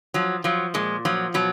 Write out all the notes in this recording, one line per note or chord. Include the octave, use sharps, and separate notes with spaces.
F3 F#3
F3 F#3
A#2 G#3
F3 F#3
B2 F#3